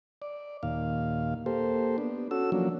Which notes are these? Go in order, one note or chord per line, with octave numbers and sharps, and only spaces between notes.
D5
D#2 A#2 F5
A#3 G4 A4 C5
B3 D4
C#4 F#4 A4 E6
F3 F#3 A#3 C#4 D4